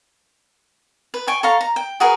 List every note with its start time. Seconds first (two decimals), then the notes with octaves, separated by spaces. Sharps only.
1.14 B4
1.27 G5 G#5 C#6
1.43 A4 C#5 F5 A#5
1.61 A#5
1.76 G5
2.00 F#4 G#4 A#4 B4